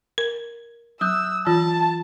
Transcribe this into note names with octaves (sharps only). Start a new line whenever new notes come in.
A#4
F#3 D#6 E6 F#6 G6
E3 F4 A5